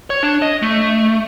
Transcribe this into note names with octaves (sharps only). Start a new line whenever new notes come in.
C#5
D4
D#5
A3